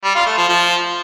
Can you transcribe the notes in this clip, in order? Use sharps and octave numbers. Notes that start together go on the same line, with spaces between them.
G3
F4
A3
F3
F3